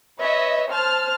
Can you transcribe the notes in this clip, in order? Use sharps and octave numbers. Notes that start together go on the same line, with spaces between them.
B4 C#5 D#5 E5
C5 A5 F6